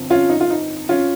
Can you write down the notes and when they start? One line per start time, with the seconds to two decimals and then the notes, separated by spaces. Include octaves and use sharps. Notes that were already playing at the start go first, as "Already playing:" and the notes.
Already playing: G1 F2
0.10 C#4 F4
0.30 D#4
0.41 F4
0.50 D#4
0.89 C#4 F4